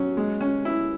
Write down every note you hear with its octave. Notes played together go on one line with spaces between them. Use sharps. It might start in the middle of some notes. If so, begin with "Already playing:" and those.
Already playing: F#3 C#4
G#3
C#4
E4